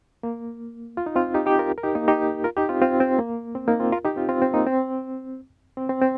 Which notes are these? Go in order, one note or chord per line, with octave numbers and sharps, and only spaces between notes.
A#3
F4
D#4
C4 F4
D#4 G4
D#4 G4
F4 A#4
A#4
D#4 G4
A#3 D#4
D#4 G4
F4 A#4
D#4 G4
C4 F4
C4 F4
C4
A#3
C4
A#3 D#4
C4 F4
F4 A#4
D#4 G4
C4 F4
C4 F4
C4
A#3 D#4
C4
C4
C4
C4